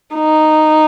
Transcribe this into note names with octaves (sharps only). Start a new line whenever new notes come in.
D#4